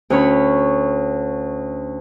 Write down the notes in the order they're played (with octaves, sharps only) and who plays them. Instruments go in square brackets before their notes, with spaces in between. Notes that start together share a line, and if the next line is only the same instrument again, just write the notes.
[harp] D2 C#4 C#5 B5